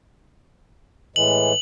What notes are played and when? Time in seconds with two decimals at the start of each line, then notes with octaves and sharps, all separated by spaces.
1.16 A2 E3 G#3 F#7